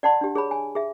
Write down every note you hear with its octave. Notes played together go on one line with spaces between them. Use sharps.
D5 F#5 A5 C6
D4 G4
G#4 C#5 B5
G#5
G#4 E5